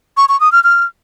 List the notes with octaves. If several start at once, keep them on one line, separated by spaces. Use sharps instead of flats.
C#6
C#6
D#6
F6
F6